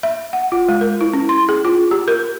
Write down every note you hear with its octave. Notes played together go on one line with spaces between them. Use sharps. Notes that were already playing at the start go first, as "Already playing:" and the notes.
E5
F#5
F4
G#3
A#4
E4
C#4
C6
G#4
F4
G4
A#4